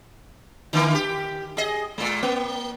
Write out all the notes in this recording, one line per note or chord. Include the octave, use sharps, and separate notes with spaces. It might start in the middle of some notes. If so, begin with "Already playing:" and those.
D3 E3 A#3
G4
G#4 D#5
A#2 G#3
A#3